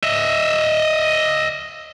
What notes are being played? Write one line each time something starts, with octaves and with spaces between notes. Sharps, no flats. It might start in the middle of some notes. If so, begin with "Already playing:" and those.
D#5 E5